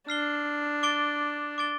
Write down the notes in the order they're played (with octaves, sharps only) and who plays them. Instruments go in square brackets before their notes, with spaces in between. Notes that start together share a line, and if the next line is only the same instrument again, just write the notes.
[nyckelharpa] D4 [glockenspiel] F6 C7 G7
[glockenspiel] D6 A6 D7 G7
D6 A6 D7 G7